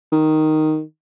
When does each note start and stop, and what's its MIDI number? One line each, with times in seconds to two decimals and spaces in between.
0.12 0.81 51